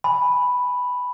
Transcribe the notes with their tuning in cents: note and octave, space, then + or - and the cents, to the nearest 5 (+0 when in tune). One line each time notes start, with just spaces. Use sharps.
G#5 +0 B5 +0